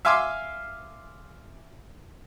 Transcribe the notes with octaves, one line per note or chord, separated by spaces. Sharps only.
E5 F5 G#5 C6 D6 E6